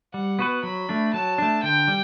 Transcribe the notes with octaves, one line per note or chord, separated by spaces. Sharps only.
G3 F#5
B3 F#4 B4
F#3 B5
A3 D4
F#3 A5
A3 D4
D3 G5
G3